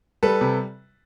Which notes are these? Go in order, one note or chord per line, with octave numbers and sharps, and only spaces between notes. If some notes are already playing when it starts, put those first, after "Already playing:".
G3 A4 B4
C3